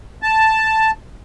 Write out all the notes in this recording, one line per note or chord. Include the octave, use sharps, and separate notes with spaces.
A5